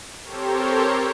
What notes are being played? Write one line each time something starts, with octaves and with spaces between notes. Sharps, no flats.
C4 G4 A4 A#4 C5 C#5